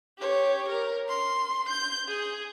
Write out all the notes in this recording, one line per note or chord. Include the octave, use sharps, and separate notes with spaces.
G4 C#5
A#4
C6
G6
G#4